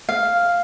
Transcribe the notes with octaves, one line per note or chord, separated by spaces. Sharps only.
F5